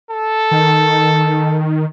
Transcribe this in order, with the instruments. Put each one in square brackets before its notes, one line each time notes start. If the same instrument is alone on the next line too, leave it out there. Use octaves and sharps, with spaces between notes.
[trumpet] A4
[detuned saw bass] D#3